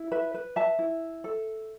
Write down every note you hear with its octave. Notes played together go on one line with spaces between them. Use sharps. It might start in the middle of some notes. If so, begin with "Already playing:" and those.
Already playing: E4
B4 E5
B4
E5 A5
E4
A4